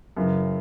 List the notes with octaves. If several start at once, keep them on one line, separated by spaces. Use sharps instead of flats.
F#2 C#3 E3